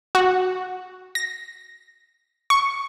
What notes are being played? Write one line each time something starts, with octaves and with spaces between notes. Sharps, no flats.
F#4
A#6
C#6